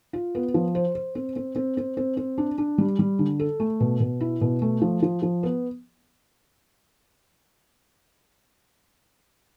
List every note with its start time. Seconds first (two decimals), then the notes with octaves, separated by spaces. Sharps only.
0.13 F4
0.35 B3
0.54 F3
0.75 C5
0.95 C5
1.15 C4
1.36 C4
1.56 C4
1.77 C4
1.97 C4
2.17 C4
2.38 D4
2.58 D4
2.78 G3
2.99 G3
3.19 D3
3.40 A4
3.60 A3
3.80 B2
4.00 B2
4.21 E4
4.41 B2
4.62 A3
4.82 F3
5.02 F3
5.22 F3
5.43 B3